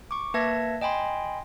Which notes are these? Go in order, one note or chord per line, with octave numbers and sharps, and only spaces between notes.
C#6 D6
A#3 B4 E5 A5 G#6 A#6
D#5 G5 G#5 B5 C6